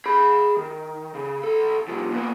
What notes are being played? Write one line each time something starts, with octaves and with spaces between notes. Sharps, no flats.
G#4 B5
D#3
C#3
B1 A4
C2 F3
A#2 B3